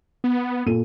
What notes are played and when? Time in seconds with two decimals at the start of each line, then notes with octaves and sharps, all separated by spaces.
0.24 B3
0.66 A#2 A4 D#7